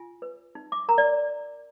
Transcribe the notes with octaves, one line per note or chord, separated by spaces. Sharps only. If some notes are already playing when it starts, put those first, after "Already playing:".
Already playing: F4 G#5
B4
D#4
D6
A#4 A#5
D5